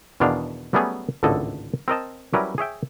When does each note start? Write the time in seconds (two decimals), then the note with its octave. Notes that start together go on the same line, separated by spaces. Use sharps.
0.20 E2 B2 D#3 D4 G#4 F5
0.73 F#3 G3 A3 B3 C#4 G#4
1.23 G#1 C#2 A2 D3 A4 D#5
1.88 C4 A#4 D#5 A5
2.33 F#3 G3 C#4 E4 A#4 B4
2.58 G#4 C#5 E5 G5